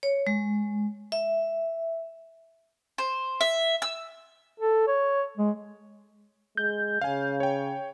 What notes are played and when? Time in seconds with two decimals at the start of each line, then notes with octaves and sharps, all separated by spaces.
0.03 C#5
0.27 G#3
1.12 E5
2.98 C5
3.41 E5
3.82 E6
4.60 A4
4.88 C#5
5.37 G#3
6.57 G#3 G6
7.01 C#3 F5 G#5
7.40 C#5 G5